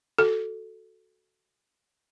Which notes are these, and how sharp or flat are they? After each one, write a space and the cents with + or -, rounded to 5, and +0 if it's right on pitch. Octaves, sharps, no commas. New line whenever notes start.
F#4 +0 A4 +0